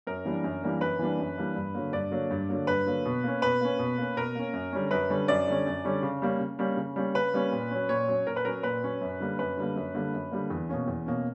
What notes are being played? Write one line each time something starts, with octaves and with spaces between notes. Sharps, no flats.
F#2 A#4
E3 G3 A#3 D4
F#2
E3 G3 A#3 D4
F#2 B4
E3 G3 A#3 D4
F#2
E3 G3 A#3 D4
G2
D3 F#3 A#3
G2 D5
D3 F#3 A#3
G2
D3 F#3 A#3
G2 B4
D3 F#3 A#3
B2
A#3 C#4
B2 B4
A#3 C#4
B2
A#3 C#4
B2 A#4
A#3 C#4
F#2
D3 G3 C#4
F#2 B4
D3 G3 C#4
F#2 D5
D3 G3 C#4
F#2
D3 G3 C#4
C#3
G3 A#3 C#4
C#3
G3 A#3 C#4
C#3
G3 A#3 C#4
C#3 B4
G3 A#3 C#4
A#2
F#3 C#4
A#2 C#5
F#3 C#4
A#2 A#4
B4
F#3 C#4 A#4
A#2 B4
F#3 C#4
F#2
D3 G3 A#3
F#2 B4
D3 G3 A#3
F#2
D3 G3 A#3
F#2
D3 G3 A#3
E2
B2 A#3 C#4
E2
B2 A#3 C#4